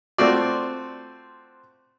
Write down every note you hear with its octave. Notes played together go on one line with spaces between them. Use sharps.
A3 C4 F4 F#4 D5